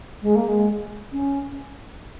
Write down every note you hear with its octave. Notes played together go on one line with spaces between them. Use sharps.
G#3
A#3
G#3
C#4